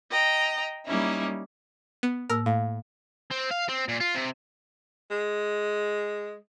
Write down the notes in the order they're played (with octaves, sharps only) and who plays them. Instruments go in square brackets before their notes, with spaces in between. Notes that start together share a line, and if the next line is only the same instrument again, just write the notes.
[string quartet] D#5 G5 A#5
G3 A#3 C#4 D#4 E4
[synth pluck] B3
[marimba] A2 A#3 E6 [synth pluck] A#4
[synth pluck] A2 [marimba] F5
[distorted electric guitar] C4
F5
C4
A#2
F4
C3
[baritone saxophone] G#3